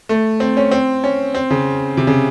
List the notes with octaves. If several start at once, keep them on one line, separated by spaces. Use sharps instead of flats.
A3
C4
C#4
C4
C#4
C4
C#3
C3
C#3